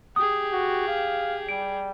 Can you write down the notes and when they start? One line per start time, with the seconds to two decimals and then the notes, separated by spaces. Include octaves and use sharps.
0.16 G4 G#4 D#6
0.52 F#4
0.88 F5
1.49 G3 D7